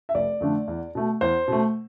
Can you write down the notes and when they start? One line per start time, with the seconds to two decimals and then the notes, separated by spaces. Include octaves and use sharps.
0.09 E5
0.14 F1 D5
0.40 F2 D3 A3 D4
0.68 E2
0.95 B2 A3
1.21 E2 C5
1.48 B2 A3